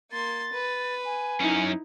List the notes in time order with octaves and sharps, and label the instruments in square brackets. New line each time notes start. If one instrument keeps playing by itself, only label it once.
[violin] A#3 C6 [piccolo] A6
[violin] B4
[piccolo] G#5
[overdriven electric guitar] F#2 C#4 [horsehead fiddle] D#4 E4